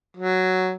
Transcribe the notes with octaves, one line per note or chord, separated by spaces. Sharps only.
F#3